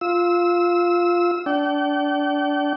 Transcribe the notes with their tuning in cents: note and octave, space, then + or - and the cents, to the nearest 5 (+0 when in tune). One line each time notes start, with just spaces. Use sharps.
F4 +0 E6 -20
D4 -20 G5 -40